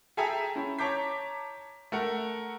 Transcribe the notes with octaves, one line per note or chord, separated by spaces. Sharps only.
G#4 A4 E5 G5 G#5 A#5
C#4 E4
C#5 A5 A#5 D6 G6 B6
A3 A#4 F#5